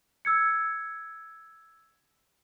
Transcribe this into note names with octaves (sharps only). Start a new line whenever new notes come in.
E6 G#6 C#7